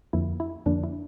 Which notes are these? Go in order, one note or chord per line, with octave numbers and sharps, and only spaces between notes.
F2 D3 F3 A#3 E4
E4
F2 D3 F3 A#3 D4
E4